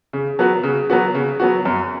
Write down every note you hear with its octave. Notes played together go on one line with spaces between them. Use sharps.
C#3
F#3 B3 F#4
C#3
F#3 B3 F#4
C#3
F#3 B3 F#4
F#2